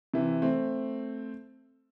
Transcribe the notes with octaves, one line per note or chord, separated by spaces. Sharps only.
C3 E3
A3 C4